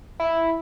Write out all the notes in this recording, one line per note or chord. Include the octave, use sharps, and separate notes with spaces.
E4